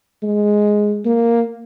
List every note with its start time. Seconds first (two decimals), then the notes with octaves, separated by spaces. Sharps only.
0.23 G#3
1.05 A#3